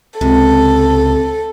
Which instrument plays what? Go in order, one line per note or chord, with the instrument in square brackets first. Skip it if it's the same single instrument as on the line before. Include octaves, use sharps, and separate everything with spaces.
[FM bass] C#2 [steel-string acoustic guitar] C3 [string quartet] A4